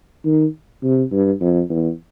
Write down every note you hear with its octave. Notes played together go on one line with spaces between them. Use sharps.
D#3
C3
G2
F2
E2